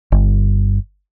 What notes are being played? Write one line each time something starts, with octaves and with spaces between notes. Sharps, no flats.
G1